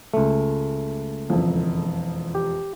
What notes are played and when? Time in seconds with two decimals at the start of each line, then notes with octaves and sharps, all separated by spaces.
0.14 C#2 A3
1.30 E1 F2
2.35 G4